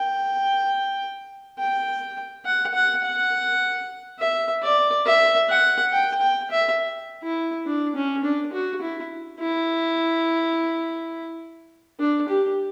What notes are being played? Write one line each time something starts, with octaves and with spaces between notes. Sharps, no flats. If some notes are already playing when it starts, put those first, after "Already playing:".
Already playing: G5
G5
F#5
F#5
F#5
E5
D5
E5
F#5
G5
G5
E5
E4
D4
C#4
D4
F#4
E4
E4
D4
G4